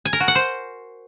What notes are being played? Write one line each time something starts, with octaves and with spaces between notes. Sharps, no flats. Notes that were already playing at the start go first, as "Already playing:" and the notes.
G#5
A#4
F#4
F#5
C5